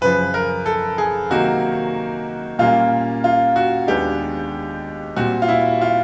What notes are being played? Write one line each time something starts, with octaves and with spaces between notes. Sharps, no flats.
F#2 C#3 F3 B4
A#4
A4
G#4
C3 D#3 F#3 A#3 F#4
A#2 G3 A#3 C#4 F4
F4
F#4
D#2 D#3 G#3 B3 D4 G4
A#2 G3 C4 F#4
F4
E4
F4